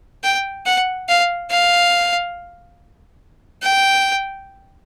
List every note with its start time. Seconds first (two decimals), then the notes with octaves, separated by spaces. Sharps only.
0.24 G5
0.66 F#5
1.09 F5
1.51 F5
3.63 G5